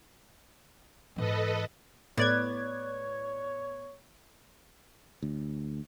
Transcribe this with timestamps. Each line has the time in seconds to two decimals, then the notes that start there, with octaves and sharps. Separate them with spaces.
1.16 G#2 E3 A4 B4 D#5
2.17 A2 B3 C#5 D5 G#6
5.23 D2